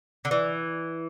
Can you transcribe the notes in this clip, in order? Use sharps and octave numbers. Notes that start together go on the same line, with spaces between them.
D3
E3